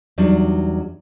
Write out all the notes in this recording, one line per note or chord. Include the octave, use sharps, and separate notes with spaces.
E2 F#3 G3 D4 D#4